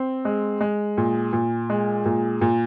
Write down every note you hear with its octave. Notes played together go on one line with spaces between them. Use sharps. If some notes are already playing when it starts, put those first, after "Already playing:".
Already playing: C4
G#3
G#3
A#2
A#2
G#3
A#2
A#2